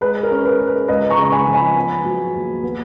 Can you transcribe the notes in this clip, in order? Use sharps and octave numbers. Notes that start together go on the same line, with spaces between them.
G#3 B4
A#4
C#4
B4
G#3
B4
C#2 B4 D#5
A#5 C#6
C#3
C#6
G#5 B5
F3
G#5 B5
B3
F#3
D#2
B3